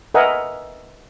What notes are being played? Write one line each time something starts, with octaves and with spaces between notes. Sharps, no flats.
A#4 B4 D#5 E5 F#5 G#5